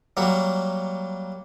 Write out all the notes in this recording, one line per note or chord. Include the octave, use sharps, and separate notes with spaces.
F#3 G3 A#3 F#4